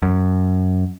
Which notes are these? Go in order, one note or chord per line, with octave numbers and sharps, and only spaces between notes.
F#2